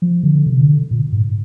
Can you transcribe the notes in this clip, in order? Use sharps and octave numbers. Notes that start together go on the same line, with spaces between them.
F3
D3
C3
D3
A#2
G#2